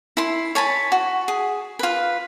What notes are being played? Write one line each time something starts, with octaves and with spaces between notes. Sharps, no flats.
E4 C6
C#5 G#5 A5 B5
F#4
G#4
F4 B4